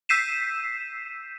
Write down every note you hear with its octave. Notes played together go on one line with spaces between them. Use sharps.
E6 G6 B6 C7 D#7 E7